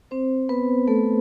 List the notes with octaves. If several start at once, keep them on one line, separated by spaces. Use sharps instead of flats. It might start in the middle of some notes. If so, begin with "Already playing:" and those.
C4 C5
B3 B4
A3 A4